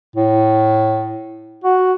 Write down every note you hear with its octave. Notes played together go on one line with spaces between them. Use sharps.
A2
F#4